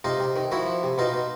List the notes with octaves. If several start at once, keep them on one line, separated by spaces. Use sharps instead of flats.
C3 D#4 F4
C3
D#3
F3 E4 F#4
F3
C3
B2 D#4 F4
B2